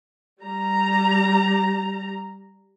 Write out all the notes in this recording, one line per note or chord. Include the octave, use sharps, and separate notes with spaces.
G3 A#5